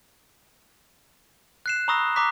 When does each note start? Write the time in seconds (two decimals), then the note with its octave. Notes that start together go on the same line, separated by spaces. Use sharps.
1.66 F#6 C7 E7
1.88 A#5 B5 C#6 D#6 E6 A#6
2.16 A#5 C#6 D6 F#6 B6